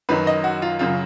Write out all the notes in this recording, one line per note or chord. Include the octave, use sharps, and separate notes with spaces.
F#2 D#3 F#3 B4
D#5
F#4
F4
F#2 C#3 F#3 F4